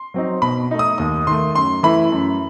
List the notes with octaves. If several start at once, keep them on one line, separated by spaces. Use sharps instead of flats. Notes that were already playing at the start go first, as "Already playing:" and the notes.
Already playing: C6
F#3 C4 D#4
B2 B5
A3 D#4
D#6
D#2 D#6
D#3 A3 C6
F#2 C6
E3 A3 E4 B5
F#2